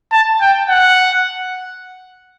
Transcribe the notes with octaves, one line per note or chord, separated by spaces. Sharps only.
A5
G5
F#5